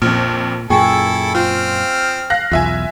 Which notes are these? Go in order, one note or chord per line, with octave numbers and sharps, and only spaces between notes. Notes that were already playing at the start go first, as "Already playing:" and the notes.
A#1 F2 A#2 F6
F#2 A#2 E4 G#4 A4 G5 G#5 C#6
C4 F4 F6
F5 F#6 A#6
B1 E2 F4 E5 G#5